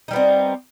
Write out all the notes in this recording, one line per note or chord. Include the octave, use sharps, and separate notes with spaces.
G3 B3 C4 D#4